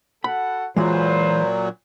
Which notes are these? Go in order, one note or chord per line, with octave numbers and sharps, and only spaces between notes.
F#4 A4 F#5 B5
A#2 E3 F#3 G#3 F4 B4 C5